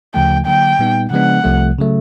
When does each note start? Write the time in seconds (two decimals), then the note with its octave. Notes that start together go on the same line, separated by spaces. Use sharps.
0.14 D2 C#3 F3 A3 G5
0.46 D3 F#3 A#3 G5
0.79 A#2 G3 B3 D#4
1.11 C#3 F3 G#3 B3 D4 F#5
1.44 C2 C3 F3 A3
1.79 C#3 F#3 A3